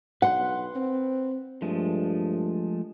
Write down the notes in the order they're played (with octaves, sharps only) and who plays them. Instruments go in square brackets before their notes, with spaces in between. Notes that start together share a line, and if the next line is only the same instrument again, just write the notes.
[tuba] B1 [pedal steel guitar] B4 C6 F#6 [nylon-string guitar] F#5
[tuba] C4
[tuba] G2 [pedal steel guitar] F3 G#3 A3